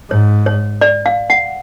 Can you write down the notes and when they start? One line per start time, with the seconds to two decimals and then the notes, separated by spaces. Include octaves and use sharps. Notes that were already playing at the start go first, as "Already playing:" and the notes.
0.10 G#2 C#5
0.46 C#5
0.81 D5
1.06 F5
1.30 F#5